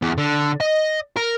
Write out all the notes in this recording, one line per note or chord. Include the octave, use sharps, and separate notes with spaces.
E2
D3
D#5
A#4